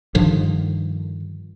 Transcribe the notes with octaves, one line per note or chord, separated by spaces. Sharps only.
G2 D3 D#3 F3